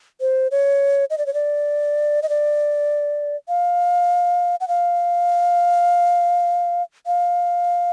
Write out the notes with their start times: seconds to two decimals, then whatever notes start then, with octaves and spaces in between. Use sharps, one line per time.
0.21 C5
0.51 C#5
1.10 D#5
1.18 D5
1.26 C#5
1.34 D5
2.23 D#5
2.29 D5
3.48 F5
4.61 F#5
4.68 F5
7.06 F5